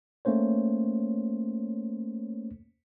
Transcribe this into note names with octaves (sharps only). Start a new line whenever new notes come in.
A3 A#3 C#4 C5 C#5